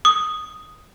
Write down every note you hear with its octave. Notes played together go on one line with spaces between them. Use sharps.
D#6